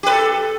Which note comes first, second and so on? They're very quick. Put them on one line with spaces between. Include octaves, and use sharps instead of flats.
G4 B4 A4